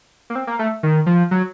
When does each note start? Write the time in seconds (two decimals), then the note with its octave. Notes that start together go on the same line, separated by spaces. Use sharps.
0.30 A#3
0.35 C4
0.47 A#3
0.59 A3
0.83 D#3
1.06 F3
1.31 F#3